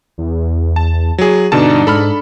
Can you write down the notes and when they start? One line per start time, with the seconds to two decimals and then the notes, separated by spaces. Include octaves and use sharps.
0.18 E2
0.76 A5
1.18 F#3 G#4
1.52 G2 B2 D3 D4 D#4 A5
1.87 G#2 A4 B5 F6